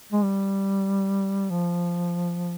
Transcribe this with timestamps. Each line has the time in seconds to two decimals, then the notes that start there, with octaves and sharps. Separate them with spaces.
0.12 G#3
0.24 G3
1.50 F3